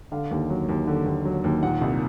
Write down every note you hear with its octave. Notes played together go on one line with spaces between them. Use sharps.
D3 F5
D#2
F#3
D#2
D3
D#2
F#3
D#2
A#2 F#5
C2